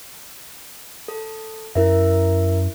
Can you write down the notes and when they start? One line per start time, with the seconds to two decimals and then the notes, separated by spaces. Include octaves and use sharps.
1.08 A4
1.75 F#2 E4 A#4 E5